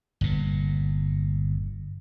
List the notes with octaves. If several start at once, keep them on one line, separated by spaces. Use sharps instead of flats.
G1 A#2